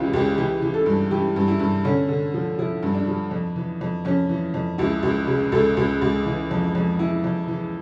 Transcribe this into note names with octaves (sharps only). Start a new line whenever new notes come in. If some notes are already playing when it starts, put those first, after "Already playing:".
Already playing: C#2 C#3 E3 F4 G4
C#2 G4
E3 G4
E3
A4
G2
E3 G4
G2
E4
G2
D3 C#4
D3
F3
F3 E4
G2
D4
F3
F2
E3
F2
F2 C#4
E3
F2
C#2 E4
C#2
C#3
C#2 A4
C#2
C#2
E3
F2
F2
E3 E4
F2
E3